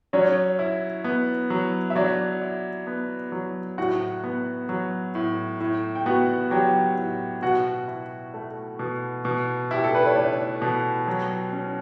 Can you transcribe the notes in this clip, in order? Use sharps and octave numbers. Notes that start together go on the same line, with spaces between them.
F#3 C#4 C#5
E4
B3
F#3
E5
F#3 D4 D5
E4
B3
F#3
A2 F#4 F#5
B3
F#3
A2
A2
G5
B3 F#4 F#5
F#3 G4 G5
A2
B2 F#4 F#5
E4
A3
B2
B2
E4 G4
A4
B4
C#5
A3 D4 D5
B2
F#3
C#4